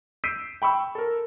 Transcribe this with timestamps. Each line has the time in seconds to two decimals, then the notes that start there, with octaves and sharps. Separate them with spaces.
0.24 E6 G6 B6 C7 D7 D#7
0.62 G5 B5 C#6 E6
0.95 A4 A#4